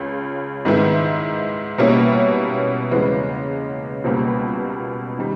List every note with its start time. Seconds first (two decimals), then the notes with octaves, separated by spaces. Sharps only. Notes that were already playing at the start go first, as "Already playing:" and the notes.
Already playing: C#2 C#3
0.65 G#2 D#3 G#3 B3 E4
1.78 B2 G3 A#3 C#4 E4
2.91 E2 C#3 E3 G#3 B3
4.04 C#2 B2 G3 A#3
5.19 D#3 G3